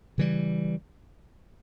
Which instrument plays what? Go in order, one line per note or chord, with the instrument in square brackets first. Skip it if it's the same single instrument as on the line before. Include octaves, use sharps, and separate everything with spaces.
[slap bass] C#3 E3 G3